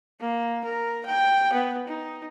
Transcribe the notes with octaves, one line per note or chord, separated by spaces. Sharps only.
A#3
A#4
G5
B3
D#4